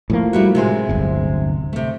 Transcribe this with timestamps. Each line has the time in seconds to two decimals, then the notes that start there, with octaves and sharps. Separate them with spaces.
0.10 A2 F3 A#3
0.33 G3 E4 F#4
0.55 C3 G#3 C5
0.89 D1 G1
1.73 C3 A3